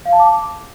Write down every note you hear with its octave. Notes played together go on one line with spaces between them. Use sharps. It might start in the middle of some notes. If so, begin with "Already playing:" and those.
F5
A5
D6